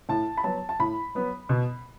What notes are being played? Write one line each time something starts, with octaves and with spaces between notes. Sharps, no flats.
A2 A5
B5
F#3 B3 A5
A5
A2 B5
F#3 B3
B2